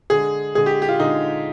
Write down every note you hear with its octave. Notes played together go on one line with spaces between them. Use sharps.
D3 G#3 G#4
D3 G#3 G#4
G4
G4
F4
D3 G#3 D#4